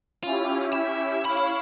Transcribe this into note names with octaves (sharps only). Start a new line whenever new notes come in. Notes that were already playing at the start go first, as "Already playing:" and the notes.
C#4 E4 F4 G4
E5
E4 C#5 F5 B5